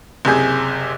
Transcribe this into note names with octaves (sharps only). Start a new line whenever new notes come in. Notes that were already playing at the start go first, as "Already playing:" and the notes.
F#1 C3 G#4 G6